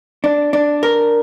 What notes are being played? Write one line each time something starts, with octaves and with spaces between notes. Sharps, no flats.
D4
D4
A#4